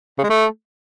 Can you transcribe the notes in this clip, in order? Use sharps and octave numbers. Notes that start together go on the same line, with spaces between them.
C#3
G#3
A3